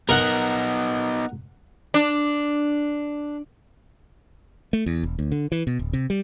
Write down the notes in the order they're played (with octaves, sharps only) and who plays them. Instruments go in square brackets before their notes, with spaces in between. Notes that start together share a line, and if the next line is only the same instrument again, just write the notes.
[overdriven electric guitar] B3 D#4 [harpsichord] A#4 F#5
[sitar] D4
[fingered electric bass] A3
E2
E1
D2
D3
E3
B2
D1
C3
G3